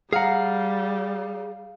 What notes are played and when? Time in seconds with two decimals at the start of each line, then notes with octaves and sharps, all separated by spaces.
0.13 G3 G#4 F5 F#5 A#5